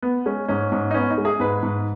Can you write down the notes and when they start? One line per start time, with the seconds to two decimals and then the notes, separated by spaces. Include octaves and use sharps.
0.02 B3
0.26 G#3 C#4
0.48 G#2 C#4
0.72 G#2
0.90 D#4
0.94 B3 C#4
1.10 D#4
1.18 G#3
1.25 G#4
1.40 G#2 B4
1.63 G#2